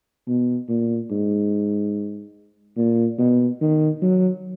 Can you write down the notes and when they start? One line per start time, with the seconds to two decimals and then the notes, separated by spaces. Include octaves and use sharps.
0.28 B2
0.69 A#2
1.11 G#2
2.77 A#2
3.19 B2
3.61 D#3
4.02 F#3